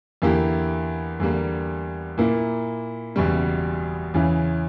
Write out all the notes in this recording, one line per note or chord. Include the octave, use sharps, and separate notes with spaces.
E2 D3 A#3 E4 G4
E2 D3 G3 A#3
A#2 A#3 E4
F#1 E2 B2 G3
E2 C#3 E3